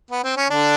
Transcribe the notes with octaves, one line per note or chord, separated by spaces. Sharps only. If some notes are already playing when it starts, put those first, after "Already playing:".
B3
C4
C#4
D3 D4